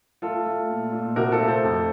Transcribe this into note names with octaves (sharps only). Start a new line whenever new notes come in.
A3 F4 A4
A3
A#2
A#2
C3 F#4 A#4
F4 A4
A3
A4 C5
F2